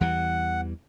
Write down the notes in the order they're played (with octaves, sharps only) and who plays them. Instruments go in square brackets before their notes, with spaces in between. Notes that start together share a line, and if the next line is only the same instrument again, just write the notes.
[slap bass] E2 E3 G3 [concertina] F#5